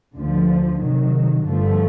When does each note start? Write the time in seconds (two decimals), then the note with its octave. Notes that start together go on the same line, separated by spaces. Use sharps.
0.15 D2 D3 F3
0.80 C3 D#3 F#3
1.45 G2 D3 F3 A3